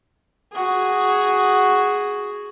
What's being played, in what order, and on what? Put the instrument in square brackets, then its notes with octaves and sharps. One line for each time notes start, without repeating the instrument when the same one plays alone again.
[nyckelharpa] F#4 G#4